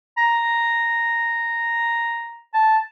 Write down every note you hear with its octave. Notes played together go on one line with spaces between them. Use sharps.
A#5
A5